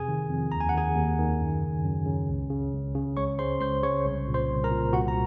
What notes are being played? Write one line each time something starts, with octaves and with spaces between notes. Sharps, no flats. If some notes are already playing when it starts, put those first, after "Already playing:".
Already playing: F2 C3 G#4 G#5
D#3
F2
D#2 A#5
G#5
F#5
D#3 G#4 G#5
D#2
D#3
F#2
C#3
F#2
C#3
C#2
C#3
C#2
C#3
C#2 C#5 C#6
C#3 C5 C6
C#2 C5 C6
C#3 C#5 C#6
C2
A#2
C5 C6
C2
A#4 A#5
A#2
C2 F#4 F#5
A#5